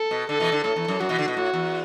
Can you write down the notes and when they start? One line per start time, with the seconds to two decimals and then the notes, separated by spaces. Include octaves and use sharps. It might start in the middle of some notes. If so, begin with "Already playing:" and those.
Already playing: A4
0.11 B2
0.29 D3 A4
0.40 B2 E3
0.52 D3
0.64 A2 A4
0.76 E2
0.88 F#2
1.00 F#2 F#4
1.09 B2 E3
1.19 D3
1.28 B2
1.36 A2 F#4
1.53 E2